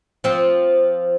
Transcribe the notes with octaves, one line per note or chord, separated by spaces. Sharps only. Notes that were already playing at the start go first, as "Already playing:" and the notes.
F3 C4